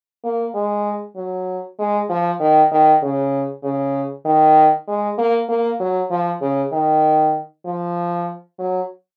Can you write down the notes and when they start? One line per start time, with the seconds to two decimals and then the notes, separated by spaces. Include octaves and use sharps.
0.24 A#3
0.55 G#3
1.16 F#3
1.79 G#3
2.10 F3
2.40 D#3
2.71 D#3
3.02 C#3
3.64 C#3
4.25 D#3
4.88 G#3
5.18 A#3
5.49 A#3
5.80 F#3
6.11 F3
6.41 C#3
6.73 D#3
7.66 F3
8.59 F#3